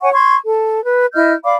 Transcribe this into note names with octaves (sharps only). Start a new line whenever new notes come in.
C#5 F#5 G#5 C#6
C6 C#6 G#6
A4
B4
E4 D#5 F6 G6
D5 F5 B5 D6